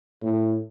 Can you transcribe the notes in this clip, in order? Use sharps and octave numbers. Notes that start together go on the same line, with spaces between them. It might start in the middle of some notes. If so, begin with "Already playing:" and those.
A2